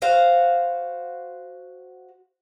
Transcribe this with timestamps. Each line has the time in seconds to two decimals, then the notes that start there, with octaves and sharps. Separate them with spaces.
0.02 F#4 C5 F5